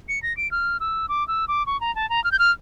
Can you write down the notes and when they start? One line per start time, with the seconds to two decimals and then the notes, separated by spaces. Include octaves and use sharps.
0.09 C#7
0.23 A#6
0.37 D7
0.51 F6
0.80 E6
1.09 D6
1.28 E6
1.48 D6
1.66 C#6
1.81 A#5
1.96 A5
2.10 A#5
2.24 F6
2.32 G6
2.39 F6